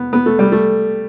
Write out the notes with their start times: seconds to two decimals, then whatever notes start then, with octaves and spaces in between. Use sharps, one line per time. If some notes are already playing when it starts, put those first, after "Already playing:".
Already playing: B3
0.13 B3
0.26 A3
0.39 G3
0.52 A3